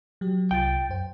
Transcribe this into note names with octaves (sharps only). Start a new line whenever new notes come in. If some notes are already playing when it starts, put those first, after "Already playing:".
F#3 G4
C2 F4 G5 A6
F#2 C5